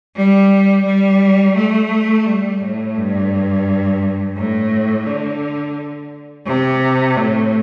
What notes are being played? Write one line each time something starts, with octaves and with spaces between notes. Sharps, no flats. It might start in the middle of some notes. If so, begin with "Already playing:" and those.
G3
G3
A3
G3
A2
G2
A2
D3
C3
A2